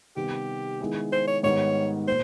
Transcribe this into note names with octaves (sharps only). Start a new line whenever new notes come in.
C3 D#3 G3 B3 G4
D#3 G#3 B3 E4 G#4
C5
C#5
G#2 D#3 G3 B3 D#4 C#5
A#2 C5